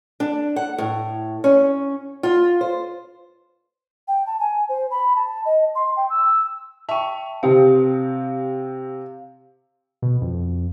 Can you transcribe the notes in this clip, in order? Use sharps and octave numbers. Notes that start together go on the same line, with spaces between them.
D4
F#5
A2
C#4
F4
C5
G5
A5
G#5
C5
B5
A5
D#5
C6
G5
E6
E5 G5 A5 C#6
C3 C4 G4 F5
B2
F2